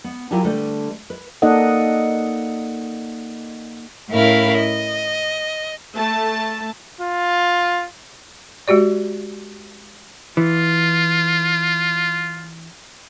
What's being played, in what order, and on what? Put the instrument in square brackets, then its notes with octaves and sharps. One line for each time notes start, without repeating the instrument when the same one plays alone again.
[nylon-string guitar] B3
F#3 E4 F4 G4 A#4 G#5
D3 G3 A3 B4
B4
[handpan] A#3 D#4 A4 D5 D#5 F#5
[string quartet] A2 C#4 E4 A#4 F5 B5
D#5
[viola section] A3 A5
[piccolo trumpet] F4
[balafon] G#3 F#4 G4 D5
[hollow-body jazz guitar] E3 [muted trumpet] F4